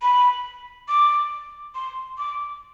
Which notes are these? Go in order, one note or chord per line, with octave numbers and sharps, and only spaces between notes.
B5
D6
C6
D6